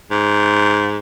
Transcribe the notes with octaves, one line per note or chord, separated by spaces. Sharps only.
G#2